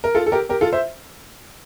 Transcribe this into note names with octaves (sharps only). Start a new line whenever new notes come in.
A#4
F4 A4
A4
G4 A#4
G4 A#4
F4 A4
C5 E5